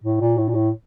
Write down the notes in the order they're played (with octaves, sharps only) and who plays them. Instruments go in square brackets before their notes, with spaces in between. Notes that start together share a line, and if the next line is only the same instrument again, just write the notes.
[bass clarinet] A2
A#2
A2
A#2
A2